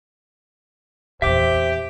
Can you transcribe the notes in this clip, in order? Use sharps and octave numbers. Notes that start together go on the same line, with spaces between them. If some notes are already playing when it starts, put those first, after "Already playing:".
E2 A#2 G4 C5 E5 D6